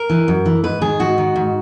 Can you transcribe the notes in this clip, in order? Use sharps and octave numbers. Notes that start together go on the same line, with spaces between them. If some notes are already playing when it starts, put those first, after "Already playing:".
Already playing: A#4
E3
F#2
E3
G#2 B4
D#3 G#4
G#2 F#4
D#3
G#2